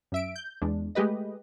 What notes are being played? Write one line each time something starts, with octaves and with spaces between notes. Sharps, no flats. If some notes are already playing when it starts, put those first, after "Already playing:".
F#2 E5 D7
G6
E2 G#3 D4
G#3 A3 G4 B4 D#5